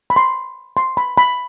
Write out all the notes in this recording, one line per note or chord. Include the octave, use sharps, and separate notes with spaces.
B5
C6
C6
B5
B5